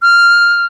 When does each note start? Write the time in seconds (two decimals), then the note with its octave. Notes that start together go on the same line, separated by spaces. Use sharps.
0.02 F6